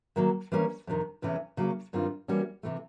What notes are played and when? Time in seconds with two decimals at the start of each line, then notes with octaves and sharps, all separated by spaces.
0.16 D#3 F#3 A#3
0.52 E3 G3 A#3 C#4
0.87 F2 C3 D#3
1.22 E2 C3 E3 A3 C#4
1.57 C#3 F#3 A#3
1.93 G2 D#3 G3 C4 F4
2.28 E3 G3 A#3 C#4 F#4
2.63 C3 E3 A3